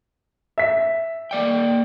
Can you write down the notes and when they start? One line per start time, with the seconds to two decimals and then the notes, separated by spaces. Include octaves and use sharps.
0.58 E5 B6
1.31 A#3 D5 G5